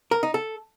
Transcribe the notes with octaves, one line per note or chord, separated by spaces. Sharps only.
A#4
D#4
A4